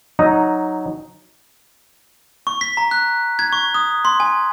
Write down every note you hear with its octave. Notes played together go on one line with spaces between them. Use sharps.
F#3 D#4
C#6
B6
A#5
F#6
G#6
C#6
D#6
C6
G#5